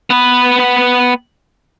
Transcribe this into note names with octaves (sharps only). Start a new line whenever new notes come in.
B3 B4